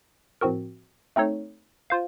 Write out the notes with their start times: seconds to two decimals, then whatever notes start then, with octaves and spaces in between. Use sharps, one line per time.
0.41 A2 F3 C4 F#4 A#4
1.16 A3 C4 D#4 A4 C#5
1.90 F4 C5 F5